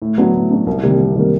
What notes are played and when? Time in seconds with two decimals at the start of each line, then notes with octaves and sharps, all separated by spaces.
0.02 A2
0.18 F#3 B3 D4
0.34 A2
0.51 F#3 B3 D4
0.67 C2
0.83 C3 D#3 G3 A#3
0.99 C2
1.16 C3 D#3 G3 A#3